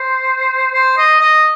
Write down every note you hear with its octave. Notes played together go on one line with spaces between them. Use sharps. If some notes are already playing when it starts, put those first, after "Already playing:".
Already playing: C5
C5
D#5
D#5